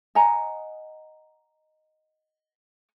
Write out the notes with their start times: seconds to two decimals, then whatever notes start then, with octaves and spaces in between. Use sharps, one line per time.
0.15 D#5 F#5 G#5 A#5